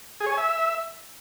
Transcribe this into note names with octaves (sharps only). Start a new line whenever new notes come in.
G#4
C#5
G#5
E5